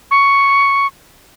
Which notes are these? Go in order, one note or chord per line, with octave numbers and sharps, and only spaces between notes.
C#6